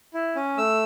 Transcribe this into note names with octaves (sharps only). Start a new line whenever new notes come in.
E4
C#4
A3 E6